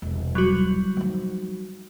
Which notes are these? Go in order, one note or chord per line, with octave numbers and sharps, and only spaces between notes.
E1 C2
F#3 G3 F#4
F3 D#4